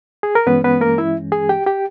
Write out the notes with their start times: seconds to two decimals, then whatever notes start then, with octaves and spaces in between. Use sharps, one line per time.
0.23 G#4
0.35 A#4
0.46 G2 E3 G#3 B3 C#4 B4
0.64 B3 B4
0.81 A#3 A#4
0.98 E4 E5
1.32 G#4 G#5
1.49 G4 G5
1.66 G4 G5